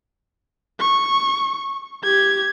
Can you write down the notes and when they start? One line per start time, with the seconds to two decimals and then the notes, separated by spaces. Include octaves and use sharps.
0.80 C#6
2.04 G4 G#6